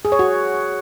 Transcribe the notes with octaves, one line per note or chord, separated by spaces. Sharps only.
G#4
C#5
F#4